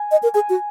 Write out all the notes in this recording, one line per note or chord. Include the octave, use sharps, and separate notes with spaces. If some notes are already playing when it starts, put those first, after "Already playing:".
Already playing: G#5
D#5
A#4
G#4 G#5
F#4